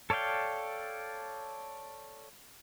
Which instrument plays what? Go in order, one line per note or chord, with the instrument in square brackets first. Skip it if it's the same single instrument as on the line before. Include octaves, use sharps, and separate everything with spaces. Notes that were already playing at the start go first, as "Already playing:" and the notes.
[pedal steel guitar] A4 C#5 D5 F5 G5